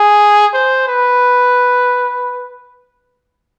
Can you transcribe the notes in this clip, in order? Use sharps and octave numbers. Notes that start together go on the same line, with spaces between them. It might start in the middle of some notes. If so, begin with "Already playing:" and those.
Already playing: G#4
C5
B4